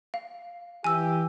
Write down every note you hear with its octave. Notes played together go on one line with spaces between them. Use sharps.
F5
E3 G4 G#5 E6